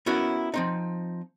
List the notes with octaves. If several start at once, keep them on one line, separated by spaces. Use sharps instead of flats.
B3 C#4 E4 F#4 A#4
F3 C4 D#4